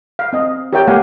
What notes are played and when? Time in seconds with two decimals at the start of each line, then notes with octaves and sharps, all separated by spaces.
0.19 F5
0.33 C4 D#5
0.73 G4 A#4 C#5 E5 G5
0.88 A3 A#3 G4 F5 F#5 G#5